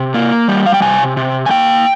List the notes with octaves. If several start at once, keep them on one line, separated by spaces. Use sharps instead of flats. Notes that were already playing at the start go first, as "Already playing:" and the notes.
Already playing: C3
A#3
G3
F5
G5
C3 G#5
C3
G#5
A#3 G5